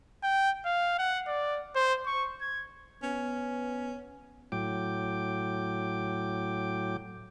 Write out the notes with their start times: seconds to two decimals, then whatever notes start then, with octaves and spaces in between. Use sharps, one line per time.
0.23 G5
0.65 F5
0.99 F#5
1.27 D5
1.75 C5
2.06 C#6
2.41 G#6
3.03 B3 C#4
4.52 A2 F#3 G5 D6